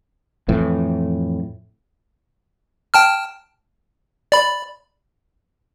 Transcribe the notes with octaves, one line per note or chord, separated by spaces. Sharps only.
F2 A2 E3
G5 A5 F6
D5 B5